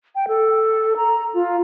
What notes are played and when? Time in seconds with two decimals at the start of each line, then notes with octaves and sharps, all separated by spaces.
0.15 G5
0.28 A4
0.97 A#5
1.34 F4